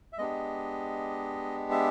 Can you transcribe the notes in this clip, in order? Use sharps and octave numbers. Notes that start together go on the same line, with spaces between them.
E5
G#3 B3 D4 G4 D#5
E5